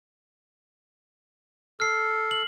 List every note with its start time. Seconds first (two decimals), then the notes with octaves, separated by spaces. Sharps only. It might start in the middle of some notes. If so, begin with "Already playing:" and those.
1.80 A4 F6 C7
2.31 F#7